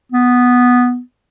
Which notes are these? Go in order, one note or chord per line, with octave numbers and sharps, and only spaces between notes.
B3